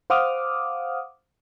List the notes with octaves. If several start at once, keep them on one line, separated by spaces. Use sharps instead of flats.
C5 F5 F#5 D6 D#6 F6